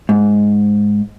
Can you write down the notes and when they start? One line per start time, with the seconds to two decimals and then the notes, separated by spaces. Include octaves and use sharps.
0.09 G#2